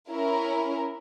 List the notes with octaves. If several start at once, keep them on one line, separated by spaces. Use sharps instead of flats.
C#4 E4 A#4